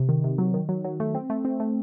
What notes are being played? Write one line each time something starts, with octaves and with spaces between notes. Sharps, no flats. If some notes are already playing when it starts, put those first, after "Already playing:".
Already playing: C3
D#3
C3
F#3
D#3
F#3
F#3
A3
C4
A3
C4
A3